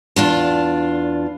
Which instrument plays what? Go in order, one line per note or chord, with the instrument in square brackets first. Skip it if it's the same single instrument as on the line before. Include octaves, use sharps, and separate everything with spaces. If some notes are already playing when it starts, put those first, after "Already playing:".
[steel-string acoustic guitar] E2 D4 F4